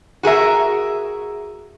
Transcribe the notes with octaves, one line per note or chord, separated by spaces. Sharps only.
F#4 G#4 A#4 E5